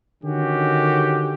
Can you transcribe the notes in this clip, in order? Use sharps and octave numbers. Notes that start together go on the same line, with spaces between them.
D3 D#3 C#4 F#4 G4